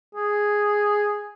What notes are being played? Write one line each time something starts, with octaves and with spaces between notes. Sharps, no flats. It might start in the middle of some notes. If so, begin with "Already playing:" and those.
G#4